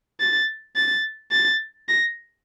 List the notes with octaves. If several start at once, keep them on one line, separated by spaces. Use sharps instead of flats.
A6
A6
A6
A#6